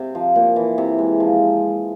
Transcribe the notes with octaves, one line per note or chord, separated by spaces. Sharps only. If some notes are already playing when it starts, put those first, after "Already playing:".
Already playing: C3
F3
A#2
E3
C3
G#3
F3